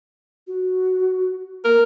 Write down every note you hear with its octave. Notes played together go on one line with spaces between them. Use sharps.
F#4
A#3 A#4